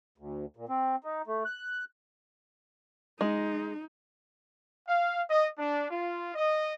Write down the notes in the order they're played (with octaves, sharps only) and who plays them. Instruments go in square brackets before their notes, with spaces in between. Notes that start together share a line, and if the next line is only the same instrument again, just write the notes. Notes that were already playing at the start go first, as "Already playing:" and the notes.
[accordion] D2
A#2
C4
D#4
A3
F#6
[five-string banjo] G#3 [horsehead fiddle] D#4
[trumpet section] F5
D#5
D4
F4
D#5